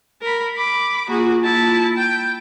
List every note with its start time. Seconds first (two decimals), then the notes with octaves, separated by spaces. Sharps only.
0.22 A#4 B5
0.55 B5 D6
1.09 A#3 F4 F#4 G#4
1.43 E4 A5
1.97 G5